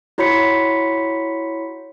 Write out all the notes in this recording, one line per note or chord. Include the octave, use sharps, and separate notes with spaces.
E4 F#4 C#5 B5 B6 C#7